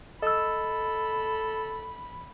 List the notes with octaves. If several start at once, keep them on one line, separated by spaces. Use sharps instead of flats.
A4 D#5 B5 E6